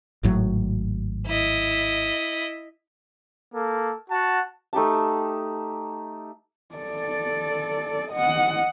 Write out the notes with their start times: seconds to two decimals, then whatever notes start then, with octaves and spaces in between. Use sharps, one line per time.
0.23 G#1 A2 F#3
1.27 E4 D#5
3.55 A#3 A4
4.10 F#4 F#5 A5
4.73 A3 D#4 G4 A5
6.76 A4 D5
8.11 D#5 F#5